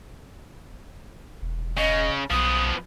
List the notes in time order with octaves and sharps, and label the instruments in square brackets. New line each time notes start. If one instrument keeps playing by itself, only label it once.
[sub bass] E1
[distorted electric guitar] C#3 [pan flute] D#5
[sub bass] B1 [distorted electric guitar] F3 B3 [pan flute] D#6